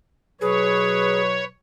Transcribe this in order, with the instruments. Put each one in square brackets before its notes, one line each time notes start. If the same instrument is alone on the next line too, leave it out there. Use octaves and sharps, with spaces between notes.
[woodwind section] B2 F#3 B4 [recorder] G#4 [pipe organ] C#5